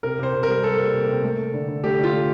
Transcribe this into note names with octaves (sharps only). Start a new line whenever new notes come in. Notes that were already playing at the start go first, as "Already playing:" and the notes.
C3 A#4
C3 C5
C3
A#4
G3
G3 A4
A#3
C3
C3
A3
A3
D3
D3
A3 G4
D3
F4
A3